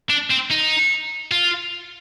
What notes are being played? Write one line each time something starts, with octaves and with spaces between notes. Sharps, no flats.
D4
C4
D#4
F4